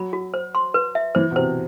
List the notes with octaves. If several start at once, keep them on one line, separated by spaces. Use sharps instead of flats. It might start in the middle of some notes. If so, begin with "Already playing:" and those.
Already playing: F#3 B5
F#4
C5
C6
B4
E5
E3 C5
B2
C3 C5